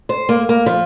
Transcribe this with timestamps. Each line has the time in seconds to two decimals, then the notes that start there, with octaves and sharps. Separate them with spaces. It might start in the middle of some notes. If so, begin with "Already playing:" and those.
0.09 C5
0.29 A#3
0.49 A#3
0.66 F3